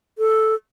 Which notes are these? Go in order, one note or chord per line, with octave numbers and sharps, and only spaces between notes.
A4